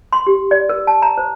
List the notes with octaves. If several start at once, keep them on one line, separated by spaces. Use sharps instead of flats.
C6
G4
D5
A#4
A5
A#5
C5